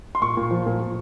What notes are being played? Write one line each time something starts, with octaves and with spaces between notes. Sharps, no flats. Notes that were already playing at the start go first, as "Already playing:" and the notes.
C6
A#2 C#6
A#2
F3
A#2
A#2